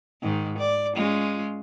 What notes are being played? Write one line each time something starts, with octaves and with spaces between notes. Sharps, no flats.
G#2 D#3
D5
G#3 C#4 F4